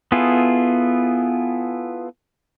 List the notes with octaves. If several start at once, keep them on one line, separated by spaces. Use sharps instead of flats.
B3 E4 F4 G#4 A4